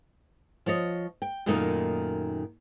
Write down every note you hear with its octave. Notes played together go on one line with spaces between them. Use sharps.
F3 F4 C#5 D#5
G5
F#2 A#2 D#3 A3 A#3 D#4